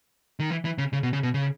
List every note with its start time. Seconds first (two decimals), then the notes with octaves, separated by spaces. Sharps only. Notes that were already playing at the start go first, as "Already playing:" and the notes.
0.40 D#3
0.50 E3
0.65 E3
0.78 C#3
0.93 C#3
1.03 B2
1.13 C#3
1.23 B2
1.34 C#3